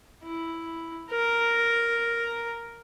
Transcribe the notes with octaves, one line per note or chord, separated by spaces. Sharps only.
E4
A#4 A#5